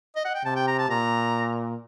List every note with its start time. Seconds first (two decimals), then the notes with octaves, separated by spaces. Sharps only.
0.16 D#5
0.25 F#5
0.35 G5
0.45 C3 A5
0.56 G5
0.68 A#5
0.79 A5
0.89 A#2 A#5